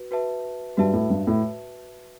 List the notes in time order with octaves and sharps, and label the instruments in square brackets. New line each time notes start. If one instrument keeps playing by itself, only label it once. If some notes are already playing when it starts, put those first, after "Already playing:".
Already playing: [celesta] F#4 B4
F#4 B4 E5 A5
[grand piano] G2 G3 [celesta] F#4 B4 E5 A5
[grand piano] A2
G2
A2